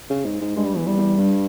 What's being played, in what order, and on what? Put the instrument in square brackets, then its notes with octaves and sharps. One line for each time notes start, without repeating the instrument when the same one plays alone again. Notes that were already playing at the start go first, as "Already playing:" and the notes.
[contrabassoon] C#3
G#2
G#2
[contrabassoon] G2 [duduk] G#3
[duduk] G3
[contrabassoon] E2 [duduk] E3
[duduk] G3
[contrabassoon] E2
G2